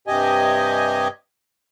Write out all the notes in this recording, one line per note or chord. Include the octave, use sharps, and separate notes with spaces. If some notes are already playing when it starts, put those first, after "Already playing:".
G2 C3 G4 D#5 G#5